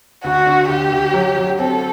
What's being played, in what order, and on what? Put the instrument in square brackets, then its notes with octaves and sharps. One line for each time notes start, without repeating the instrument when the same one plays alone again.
[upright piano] D2 [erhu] F#4
[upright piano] D3
[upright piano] D2 [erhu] G4
[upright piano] D2
F#3
F#3
[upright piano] C4 [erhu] A4